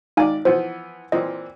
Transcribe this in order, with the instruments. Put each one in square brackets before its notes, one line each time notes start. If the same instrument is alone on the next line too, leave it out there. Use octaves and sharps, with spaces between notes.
[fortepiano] G#1 D5 [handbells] D#4 F5 G#5
[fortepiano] E3 F3 B3 [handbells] C5
[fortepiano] A#2 E3 C4 [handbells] D#5